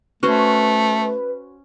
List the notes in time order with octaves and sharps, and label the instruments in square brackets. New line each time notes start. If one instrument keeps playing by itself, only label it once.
[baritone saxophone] A3 [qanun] C#4 F#4 C5 [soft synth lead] B4